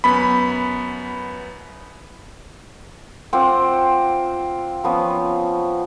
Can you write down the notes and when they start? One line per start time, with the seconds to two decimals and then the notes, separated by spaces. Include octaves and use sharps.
0.04 F#2 B3 B5
3.33 C4 F4 F#5 D6
4.84 F3 B3 C#4